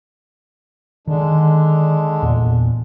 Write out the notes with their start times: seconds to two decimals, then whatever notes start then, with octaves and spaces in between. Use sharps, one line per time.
1.07 D3 D#3 G#3 D4
2.23 E2 A#2